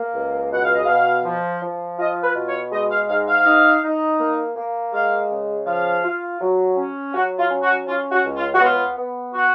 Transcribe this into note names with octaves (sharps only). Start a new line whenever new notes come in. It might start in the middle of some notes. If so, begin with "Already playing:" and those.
Already playing: A#3
C#2
B2 F#5
F5
D#5
B2 F5
F3
F3
F4 D#5
B4
B2
C#5
G#3 D#5
F5
G#2 F5
F5
D#4
D#4
A#3
A#3
G#3 F5
C#3
F3 F5
F4
F#3
C#4
F#3 F#4
F4
C#4
F#4
C#4 F4
F#4
C#2
F4
F#4
B3 F4
B3
F#4